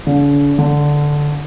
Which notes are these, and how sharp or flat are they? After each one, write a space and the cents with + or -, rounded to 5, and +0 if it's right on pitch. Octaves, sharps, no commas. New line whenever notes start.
D3 -45
D3 -5